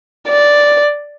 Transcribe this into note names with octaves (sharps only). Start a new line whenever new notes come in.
D5